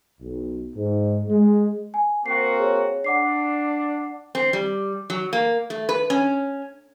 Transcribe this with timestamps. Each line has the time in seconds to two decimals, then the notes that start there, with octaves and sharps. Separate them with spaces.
0.21 B1
0.75 G#2
1.28 G#3
1.94 G#5
2.26 A#3 C4 F#4 G5 C7
2.59 G#4 C#5
3.04 D4 F#5 D6 C7
4.35 C4
4.53 G3
5.10 F#3
5.33 A#3
5.70 A3
5.89 B4
6.10 C#4